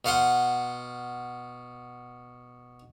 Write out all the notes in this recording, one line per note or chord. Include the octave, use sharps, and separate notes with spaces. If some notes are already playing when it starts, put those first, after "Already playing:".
B2 F5 F#5 C6